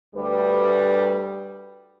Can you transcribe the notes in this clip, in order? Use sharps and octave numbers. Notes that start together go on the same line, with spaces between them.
D2 G3 B4